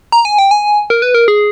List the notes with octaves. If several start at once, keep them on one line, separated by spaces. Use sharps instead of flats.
A#5
G#5
G5
G#5
A#4
B4
A#4
G#4